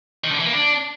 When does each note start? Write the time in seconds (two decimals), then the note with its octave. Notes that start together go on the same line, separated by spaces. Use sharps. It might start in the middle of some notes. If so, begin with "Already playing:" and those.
0.24 D#3
0.31 D3
0.38 E3
0.46 A#3
0.53 D4